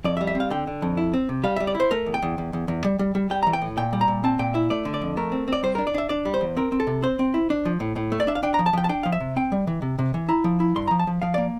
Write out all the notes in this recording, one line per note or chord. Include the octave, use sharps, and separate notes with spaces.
F2 D5
E5
G3
E5
C4
F5
D3 G5
D3
F2
E4
C4
C3
G3 F5
G3 E5
D5
E4
C5
A3 A#4
E2
G5
E2
E2
E2
E2
G3
G3
G3
G3 G5
E3 A#5
G5
A2
A#2 G5
G3
A#5
A#2
C4 A5
A#2 G5
E4 E5
A3 D5
D3
D5
F2
A3 A#4
C4
C4 D5
G3 C5
D4 A#4
D5
D4 E5
D4 D5
G3
C5
E2
C4 A#4
C4
A4
C3
C4 C5
C4
E4
D4
F3
A2
A2
A3
D5
D4 E5
F5
D4 G5
F3 A#5
A5
F3 G5
A5
D4 G5
F3 F5
E5
C3
C4 G5
G3
E3
C3
C3
E3
E4 A#5
F3
E4
G2 C6
F3 A#5
A5
F3
F3 F5
A#3 D5